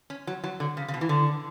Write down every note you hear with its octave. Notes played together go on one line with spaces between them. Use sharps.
C#4
F#3
F#3
D3
C#3
C#3
B2
E3
D3